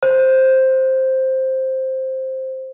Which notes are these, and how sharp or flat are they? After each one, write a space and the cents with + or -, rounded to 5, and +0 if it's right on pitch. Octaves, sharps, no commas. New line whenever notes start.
C5 +5